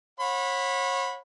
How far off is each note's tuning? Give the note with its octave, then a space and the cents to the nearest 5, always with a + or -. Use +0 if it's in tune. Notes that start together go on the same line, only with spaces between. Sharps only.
C#5 -35 F#5 -35 B5 +0